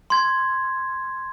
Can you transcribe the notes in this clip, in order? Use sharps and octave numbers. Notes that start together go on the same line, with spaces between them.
C6 G#6